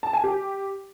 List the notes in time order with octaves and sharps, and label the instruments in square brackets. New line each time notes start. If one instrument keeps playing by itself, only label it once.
[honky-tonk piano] A5
G#5
G4